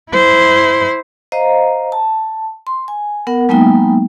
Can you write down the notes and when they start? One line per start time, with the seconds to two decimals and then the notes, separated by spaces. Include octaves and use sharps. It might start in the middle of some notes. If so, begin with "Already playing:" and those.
0.11 E4 C5
1.32 C5 D#5 F5 A#5
1.92 A5
2.67 C6
2.88 G#5
3.27 B3 A#4 F#5
3.49 F#3 G#3 A#3 B3 D#4 G5